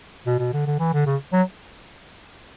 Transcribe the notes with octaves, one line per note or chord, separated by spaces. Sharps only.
B2
B2
D3
D3
E3
D3
C#3
F#3